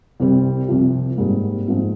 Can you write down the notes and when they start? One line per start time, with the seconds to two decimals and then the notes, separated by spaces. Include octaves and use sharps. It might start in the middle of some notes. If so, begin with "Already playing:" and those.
0.20 C2 C3 G3 C4
0.68 C2 C3 F3
1.18 G#2 G3 A#3
1.67 G#2 F3 C4